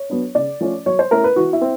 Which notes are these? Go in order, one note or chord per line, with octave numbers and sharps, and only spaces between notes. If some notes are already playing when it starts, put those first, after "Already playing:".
Already playing: C#5
F#3 B3 D4
C#3 D5
F3 A3 C#4
F#3 C#5
C5
A3 C#4 E4 A#4
B4
E3 F#4
E4
C4